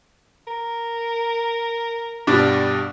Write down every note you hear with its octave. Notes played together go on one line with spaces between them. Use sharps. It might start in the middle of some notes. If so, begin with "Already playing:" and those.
A#4
G2 B2 G3 D4